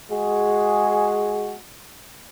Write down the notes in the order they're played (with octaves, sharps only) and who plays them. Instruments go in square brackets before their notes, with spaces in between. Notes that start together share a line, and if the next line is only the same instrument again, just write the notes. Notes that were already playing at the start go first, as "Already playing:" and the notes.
[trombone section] G#3 F#4 G#4